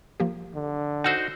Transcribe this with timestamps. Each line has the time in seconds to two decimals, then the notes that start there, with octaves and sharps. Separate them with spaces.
0.20 F3 A#3 G4
0.55 D3
1.04 D#4 F#4 C5 F#5 E6 G6